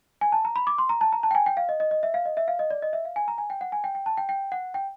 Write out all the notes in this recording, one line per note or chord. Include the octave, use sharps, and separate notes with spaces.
G#5
A5
A#5
B5
D6
C6
A#5
A5
A#5
A5
G5
G#5
G5
F5
D#5
D#5
D#5
E5
F5
D#5
E5
F5
D#5
D5
D#5
E5
F5
G#5
A#5
G#5
G5
F#5
G#5
G5
G5
A5
G5
G5
F#5
G5